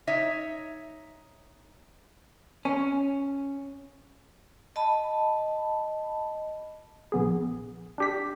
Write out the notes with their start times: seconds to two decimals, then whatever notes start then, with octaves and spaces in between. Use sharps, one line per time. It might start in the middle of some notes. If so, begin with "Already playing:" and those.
0.07 D#4 C#5 E5
2.65 C#4
4.76 D#5 A5 B5
7.12 A#1 B3 G#4
7.98 D4 G4 B6